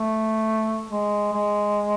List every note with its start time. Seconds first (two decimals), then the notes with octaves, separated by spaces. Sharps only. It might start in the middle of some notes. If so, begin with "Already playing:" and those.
Already playing: A3
0.90 G#3
1.33 G#3